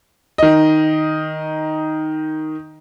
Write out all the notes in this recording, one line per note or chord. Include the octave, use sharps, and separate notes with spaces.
D#3 D#5